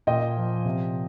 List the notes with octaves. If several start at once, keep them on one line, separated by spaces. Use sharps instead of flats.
A#2 D#5 G5
F3
C3